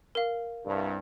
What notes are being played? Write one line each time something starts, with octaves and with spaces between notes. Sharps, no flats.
A#4 F5
C2 G2